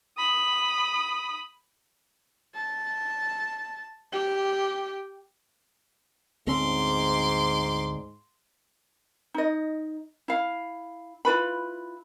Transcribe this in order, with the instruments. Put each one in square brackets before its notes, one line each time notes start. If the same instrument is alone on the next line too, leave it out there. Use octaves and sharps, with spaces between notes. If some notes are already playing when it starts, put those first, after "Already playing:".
[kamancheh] B5 D#6
[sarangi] A5
G4
[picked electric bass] D2 C4 C#4 [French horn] G#2 [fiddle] C6 D6
[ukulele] D#4 D#5
E4 F5
E4 F4 B4 B5